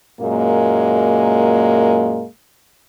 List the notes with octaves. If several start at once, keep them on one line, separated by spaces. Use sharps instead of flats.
F#2 A#2 G#3 A#3